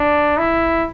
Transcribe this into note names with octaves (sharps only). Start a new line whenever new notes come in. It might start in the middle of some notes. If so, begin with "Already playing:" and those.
Already playing: D4
E4